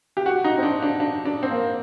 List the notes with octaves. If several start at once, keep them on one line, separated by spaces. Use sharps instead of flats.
G4
F#4
D#4
C4
D4
D4
D4
D4
C4
A#3